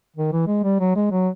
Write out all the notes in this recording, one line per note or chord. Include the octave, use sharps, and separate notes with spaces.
D#3
E3
G#3
G3
F#3
G#3
F#3